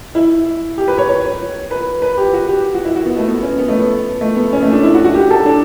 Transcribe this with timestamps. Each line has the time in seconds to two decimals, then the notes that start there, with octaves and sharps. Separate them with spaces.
0.15 E4
0.78 G4
0.88 B4
0.98 C#5
1.08 C#5
1.71 B4
2.02 B4
2.17 G4
2.33 F#4
2.49 G4
2.75 F#4
2.85 E4
2.96 F#4
3.06 B3
3.17 A3
3.28 B3
3.43 C#4
3.58 B3
3.68 A3
3.80 B3
4.21 A3
4.36 B3
4.53 C#4
4.63 A3
4.73 D4
4.83 E4
4.94 F#4
5.04 F#4
5.15 G4
5.30 A4
5.46 D4